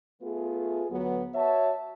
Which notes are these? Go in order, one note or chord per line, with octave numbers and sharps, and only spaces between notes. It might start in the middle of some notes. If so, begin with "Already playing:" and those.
A3 B3 F4 G#4
D2 F#3 B3
F#4 C#5 E5 A5